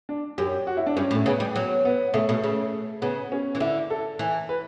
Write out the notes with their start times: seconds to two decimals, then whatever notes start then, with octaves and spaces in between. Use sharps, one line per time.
0.09 D4
0.38 F#2 G4
0.67 F#4
0.77 E4
0.87 D4
0.97 G2 C#4
1.11 A2
1.15 A3
1.26 C#3 B3
1.40 G3
1.56 F#3
1.85 B3
2.14 C#3 A3
2.29 B2 A3
2.43 C#3
3.02 C#3 B3
3.32 C#4
3.55 E3
3.60 D3 E4
3.90 A4
4.19 E3
4.49 B4